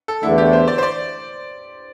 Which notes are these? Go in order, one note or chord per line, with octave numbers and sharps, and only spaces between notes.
A4
E2 D3 A3 E4
G4
C5
D5
C5
D5